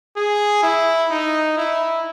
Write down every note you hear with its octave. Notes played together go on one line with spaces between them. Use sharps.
G#4
E4
D#4
E4